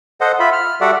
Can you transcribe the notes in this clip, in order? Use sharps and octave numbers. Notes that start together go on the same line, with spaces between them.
A4 C5 D#5 F#5
F4 E5 B5
F6
G3 F#4 A4 D5 E5 F#5